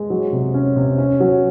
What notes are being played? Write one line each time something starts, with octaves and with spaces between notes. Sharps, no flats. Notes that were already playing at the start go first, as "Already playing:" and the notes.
Already playing: G#3
F#3
C3
C#4
C3
C#4
F#3